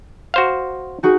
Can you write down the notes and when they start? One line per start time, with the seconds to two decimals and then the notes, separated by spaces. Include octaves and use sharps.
0.34 F#4 C5 F5
1.03 D#4 F#4 G#4